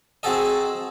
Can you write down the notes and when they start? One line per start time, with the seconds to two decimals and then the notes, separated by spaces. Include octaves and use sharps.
0.23 C4 F#4 G#4 A4 D#5